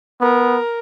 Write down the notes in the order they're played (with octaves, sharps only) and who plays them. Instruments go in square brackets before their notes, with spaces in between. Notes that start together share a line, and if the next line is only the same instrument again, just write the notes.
[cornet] B3 [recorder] A#4